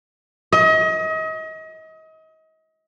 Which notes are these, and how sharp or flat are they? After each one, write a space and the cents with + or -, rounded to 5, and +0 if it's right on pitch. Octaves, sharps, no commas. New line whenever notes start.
D#5 +35